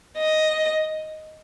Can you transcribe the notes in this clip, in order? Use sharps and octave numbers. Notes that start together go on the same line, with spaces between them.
D#5